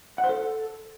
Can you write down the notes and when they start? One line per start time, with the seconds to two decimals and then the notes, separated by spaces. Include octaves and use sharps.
0.18 F#5
0.24 C5
0.29 A4